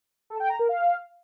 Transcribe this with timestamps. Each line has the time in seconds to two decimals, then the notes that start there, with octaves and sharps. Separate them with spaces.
0.30 A4
0.40 G5
0.50 A#5
0.59 A#4
0.69 F5